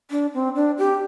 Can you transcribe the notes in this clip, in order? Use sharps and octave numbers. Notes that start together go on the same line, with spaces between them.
D4
C4
D4
G4